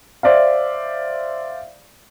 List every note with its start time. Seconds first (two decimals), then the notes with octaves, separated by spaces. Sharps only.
0.23 C5 D5 E5 F5